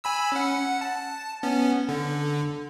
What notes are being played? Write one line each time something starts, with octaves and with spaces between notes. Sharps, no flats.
G#5 B5 E6
C#4 F#5
F#5
A5
B3 C#4
D3